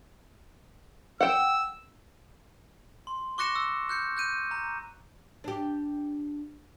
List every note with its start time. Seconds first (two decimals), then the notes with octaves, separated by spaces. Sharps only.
1.21 F#5 G5 E6
3.07 C6
3.38 C#6 D6 F#6 A#6 C#7 E7
3.55 E6
3.89 F#6 G6 C#7
4.17 F#6 G6 D#7
4.51 A#5
5.44 D4 G4